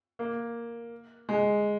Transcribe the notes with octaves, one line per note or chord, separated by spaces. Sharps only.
A#3
G#3